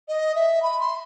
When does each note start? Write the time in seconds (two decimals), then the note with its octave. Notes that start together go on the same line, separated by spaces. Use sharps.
0.08 D#5
0.35 E5
0.62 B5
0.80 C6